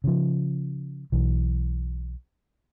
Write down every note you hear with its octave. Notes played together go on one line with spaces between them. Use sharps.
C#3 F3
B1 E3